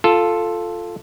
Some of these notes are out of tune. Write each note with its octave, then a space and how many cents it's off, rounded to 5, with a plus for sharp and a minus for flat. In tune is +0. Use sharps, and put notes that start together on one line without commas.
F4 +0 A4 +0